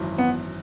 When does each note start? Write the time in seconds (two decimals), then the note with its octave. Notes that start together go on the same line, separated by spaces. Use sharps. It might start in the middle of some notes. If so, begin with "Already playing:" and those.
Already playing: G#1 F#2 E3
0.18 B3